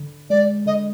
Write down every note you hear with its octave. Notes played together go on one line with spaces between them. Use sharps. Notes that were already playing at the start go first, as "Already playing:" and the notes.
Already playing: D3
G#3 D5
D3 D#5